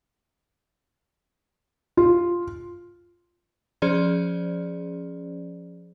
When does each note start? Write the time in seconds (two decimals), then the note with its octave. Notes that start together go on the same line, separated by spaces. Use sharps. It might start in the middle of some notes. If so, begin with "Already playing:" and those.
1.97 F4
3.82 F3 C#4 G#4 C5 D5